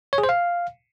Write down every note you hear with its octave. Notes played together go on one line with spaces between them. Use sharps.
C#5
G#4
C5
F5